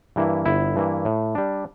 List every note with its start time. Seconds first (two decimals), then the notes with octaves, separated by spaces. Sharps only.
0.16 G2 E3 A#3 E4
0.45 G1 E4
0.76 G2 E3 A#3 E4
1.05 A2
1.35 G3 D4